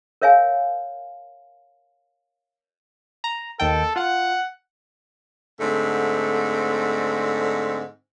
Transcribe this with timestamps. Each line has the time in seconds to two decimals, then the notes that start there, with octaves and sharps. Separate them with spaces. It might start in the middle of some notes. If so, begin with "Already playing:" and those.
0.22 A#4 C#5 E5 F5 G#5
3.24 A#5
3.60 D#2 D#3 A4 G5
3.96 F4 F#5
5.60 G#2 D3 A3 C4